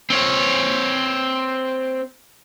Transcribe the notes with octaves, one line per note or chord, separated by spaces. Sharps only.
C4 C#5